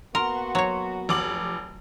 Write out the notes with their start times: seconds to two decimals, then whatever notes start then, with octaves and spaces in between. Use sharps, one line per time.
0.15 A#3 B3 F#4 A#4 C6
0.55 F#3 C#5
1.09 F1 D6 F#7